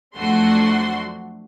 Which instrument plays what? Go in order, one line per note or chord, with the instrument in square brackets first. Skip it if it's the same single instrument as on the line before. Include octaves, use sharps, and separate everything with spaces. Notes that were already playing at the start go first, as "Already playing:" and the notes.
[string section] F2 F#3 A3 D4 F#4 C6